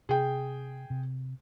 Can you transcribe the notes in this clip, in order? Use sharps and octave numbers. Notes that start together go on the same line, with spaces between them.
C3 G#4 G5
C3